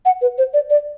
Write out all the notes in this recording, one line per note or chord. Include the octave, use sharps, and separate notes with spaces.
F#5
B4
C5
D5
D5